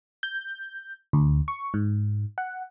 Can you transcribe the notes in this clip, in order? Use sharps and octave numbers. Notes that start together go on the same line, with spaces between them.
G6
D2
C#6
G#2
F#5